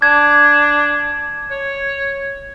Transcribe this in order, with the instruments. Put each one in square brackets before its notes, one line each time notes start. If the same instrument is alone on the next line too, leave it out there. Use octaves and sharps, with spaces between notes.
[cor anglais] D4 [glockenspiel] G#6
[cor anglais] C#5